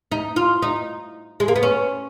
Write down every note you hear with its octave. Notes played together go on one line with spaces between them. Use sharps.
D#4
F4
D#4
G#3
A#3
B3
C#4